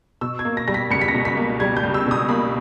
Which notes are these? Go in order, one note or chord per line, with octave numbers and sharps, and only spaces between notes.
B2 E6
G#6
A#3
A#6
G3 A#6
B6
C#2 C#7
B6
A#6
B2
B6
A#3
G3 G#6
G6
C#2
E6
B2 D#6
A#3 B5